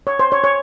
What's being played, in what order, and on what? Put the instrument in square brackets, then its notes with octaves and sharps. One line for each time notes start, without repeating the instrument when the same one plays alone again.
[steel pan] C#5
C5
C#5
C#5